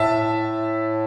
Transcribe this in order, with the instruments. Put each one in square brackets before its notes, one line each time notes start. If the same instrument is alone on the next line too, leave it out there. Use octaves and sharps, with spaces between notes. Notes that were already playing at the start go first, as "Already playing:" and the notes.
Already playing: [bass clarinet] A2 [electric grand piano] E5 A5